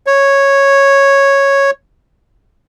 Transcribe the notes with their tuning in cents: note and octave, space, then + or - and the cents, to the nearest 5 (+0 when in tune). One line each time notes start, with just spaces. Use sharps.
C#5 -5